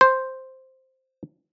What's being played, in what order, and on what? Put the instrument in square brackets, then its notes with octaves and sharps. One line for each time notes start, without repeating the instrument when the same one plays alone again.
[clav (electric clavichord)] C5